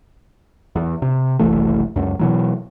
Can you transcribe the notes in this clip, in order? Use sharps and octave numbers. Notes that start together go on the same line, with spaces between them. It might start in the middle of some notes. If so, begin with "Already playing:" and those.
E2
C3
F#1 C2 E3 A3
C#2 F#2
B2 E3 F#3